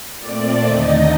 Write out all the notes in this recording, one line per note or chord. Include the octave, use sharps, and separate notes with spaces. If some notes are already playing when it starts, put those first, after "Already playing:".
A#2 A3 C4 D5
D#2 D3 A3 D#4 D#5